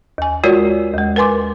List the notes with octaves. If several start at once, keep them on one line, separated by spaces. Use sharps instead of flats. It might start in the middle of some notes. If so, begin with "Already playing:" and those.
D#2 G#5
G#3 F4 F#4 A#4 C#5 D5
D#2 G#3
A#4 B4 G#5 C6 D6